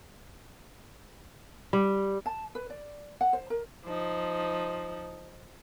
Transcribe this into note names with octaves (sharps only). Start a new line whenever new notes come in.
G3
A5
B4
D5
F#5
C5
A#4
F3 D#4